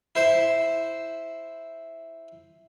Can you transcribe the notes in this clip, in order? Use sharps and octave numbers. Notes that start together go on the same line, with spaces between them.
E4 C5 E5